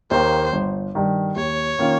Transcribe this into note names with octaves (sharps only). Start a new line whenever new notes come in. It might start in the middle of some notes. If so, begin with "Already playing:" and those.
D#2 D#3 A#3 C5
G1
G2 D#3
D#2 C#5
D#3 A#3 C#4 F4